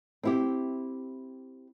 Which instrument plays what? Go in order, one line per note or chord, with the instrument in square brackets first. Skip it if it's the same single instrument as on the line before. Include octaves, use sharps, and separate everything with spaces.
[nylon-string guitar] C4 E4 G4